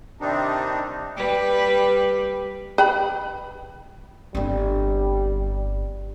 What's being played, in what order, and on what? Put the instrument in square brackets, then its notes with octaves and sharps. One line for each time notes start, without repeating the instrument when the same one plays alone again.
[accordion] C3 D#3 G3 C4 D4 D#4
[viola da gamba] G3 B4
[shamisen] B4 G5 B5
[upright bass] G1 C4 [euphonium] G3